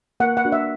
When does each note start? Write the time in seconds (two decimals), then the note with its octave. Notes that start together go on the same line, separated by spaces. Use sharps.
0.20 A#3 F#5
0.37 F#5
0.45 D4 F#4
0.52 E5